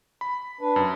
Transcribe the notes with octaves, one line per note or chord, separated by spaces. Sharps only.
B5
D4 B4
F#2